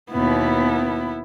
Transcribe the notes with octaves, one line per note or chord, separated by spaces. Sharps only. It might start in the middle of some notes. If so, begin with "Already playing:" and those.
D#2 B2 B3 E4